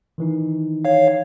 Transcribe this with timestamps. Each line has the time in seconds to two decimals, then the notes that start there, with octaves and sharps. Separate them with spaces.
0.18 D#3 E3 D#4
0.85 C#5 F5